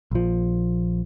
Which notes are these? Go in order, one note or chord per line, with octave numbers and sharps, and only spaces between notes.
A#1 F3